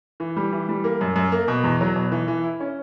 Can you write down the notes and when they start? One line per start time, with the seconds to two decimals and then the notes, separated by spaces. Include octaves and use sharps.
0.20 E3
0.36 G3
0.52 E3
0.69 G3
0.84 A#3
1.01 F#2
1.16 F#2
1.32 A#3
1.48 B2
1.64 E2
1.81 F#3
1.96 B2
2.12 E3
2.28 E3
2.44 E4
2.60 C#4